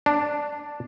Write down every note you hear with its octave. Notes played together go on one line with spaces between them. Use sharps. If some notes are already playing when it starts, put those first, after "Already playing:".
D4